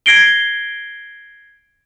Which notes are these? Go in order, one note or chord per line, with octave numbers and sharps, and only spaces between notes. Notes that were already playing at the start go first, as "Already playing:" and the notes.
G#6 A#6 C7 D7 G7